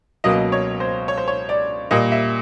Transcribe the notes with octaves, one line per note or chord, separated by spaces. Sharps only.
C#2 B2 F#3 A#3 D#5
C#5
C5
C#5
C5
C#5
D5
A#2 G3 A#3 D#5
E5